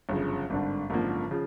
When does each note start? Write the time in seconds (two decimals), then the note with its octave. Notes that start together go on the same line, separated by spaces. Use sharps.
0.09 G1 F#2 C#3 F3
0.50 G#1 G2 D3
0.90 G#1 F#2 D3 F3 A#3
1.31 C#3 F3